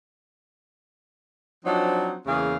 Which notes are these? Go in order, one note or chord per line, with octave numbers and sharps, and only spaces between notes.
F3 F#3 C4 D4 D#4
E2 C#3 A#3 G#4 F5